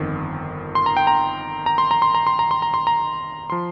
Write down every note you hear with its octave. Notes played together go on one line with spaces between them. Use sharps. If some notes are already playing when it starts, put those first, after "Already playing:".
Already playing: G1 F2 D#3
C6
A#5
G5
A#5
A#5
C6
A#5
C6
A#5
C6
A#5
C6
A#5
C6
A#5
F3 C6